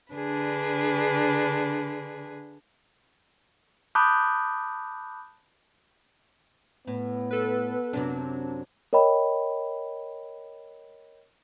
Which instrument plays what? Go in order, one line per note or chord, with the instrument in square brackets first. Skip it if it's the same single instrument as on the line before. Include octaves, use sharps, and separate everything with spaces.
[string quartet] D3 D4 G#4 B4
[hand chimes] A5 B5 D6 D#6 F#6 G6
[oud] A2 [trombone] B3
[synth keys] A4 B4
[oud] F#2 C3 F#3 [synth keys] D4
[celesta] A#4 C#5 D#5 G5 B5